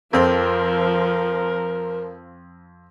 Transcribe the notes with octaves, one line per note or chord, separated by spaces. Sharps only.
F2 F3 C4 A#4